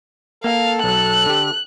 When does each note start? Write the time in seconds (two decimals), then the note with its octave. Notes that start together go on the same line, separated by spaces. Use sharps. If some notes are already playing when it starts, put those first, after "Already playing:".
0.44 A#3 A4 F5
0.84 B1 F#3 F#6
1.26 D3 G4